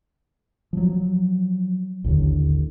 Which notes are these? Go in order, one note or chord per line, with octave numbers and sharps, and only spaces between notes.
F3 F#3
A1 D#2 D3